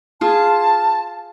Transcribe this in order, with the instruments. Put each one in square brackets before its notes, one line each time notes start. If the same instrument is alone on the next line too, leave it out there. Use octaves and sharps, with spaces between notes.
[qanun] F4 G#4 [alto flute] A5